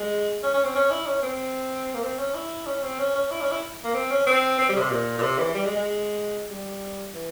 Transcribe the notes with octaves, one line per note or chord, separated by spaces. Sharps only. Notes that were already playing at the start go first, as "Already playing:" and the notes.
Already playing: G#3
C#4
C#4
C4
C#4
E4
C#4
C4
A#3
C4
C#4
E4
C#4
C4
C#4
C#4
E4
C#4
E4
A#3
C4
C#4
C4
C4
G3
C#3
C3
A#2
A#2
C3
E3
G3
G#3
G#3
G3
E3